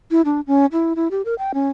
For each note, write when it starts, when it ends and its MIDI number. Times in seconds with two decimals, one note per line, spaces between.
0.11 0.22 64
0.25 0.41 62
0.47 0.66 61
0.72 0.93 64
0.96 1.08 64
1.11 1.22 67
1.25 1.35 70
1.39 1.52 79
1.54 1.68 61